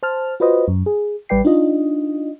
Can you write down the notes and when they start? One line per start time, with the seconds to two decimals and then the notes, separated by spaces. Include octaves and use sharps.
0.03 C5 A5 F6
0.40 F4 F#4 B4 C5 D#5
0.68 F#2
0.86 G#4
1.29 A1 G3 B4 D5 G5 C7
1.45 D4 D#4 F4 D#5